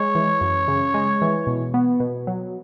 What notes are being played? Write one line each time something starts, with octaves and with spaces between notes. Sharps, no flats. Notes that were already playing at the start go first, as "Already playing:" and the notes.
Already playing: G#3 C#5
E3
F#2
C#3
G#3
E3
B2
B3
B2
F#3